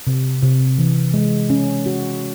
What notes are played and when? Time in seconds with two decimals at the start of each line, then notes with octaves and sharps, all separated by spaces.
0.07 C3
0.42 C3
0.78 E3
1.14 G#3
1.50 C#4
1.86 F#4